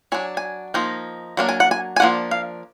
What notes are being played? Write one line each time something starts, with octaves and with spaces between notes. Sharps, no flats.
F#3 D4 G#5
G#5
F3 A#3 D#4
F#3 A#3 D4
G#5
F#5
G#5
G#5
F3 A#3 D4 F#5
F5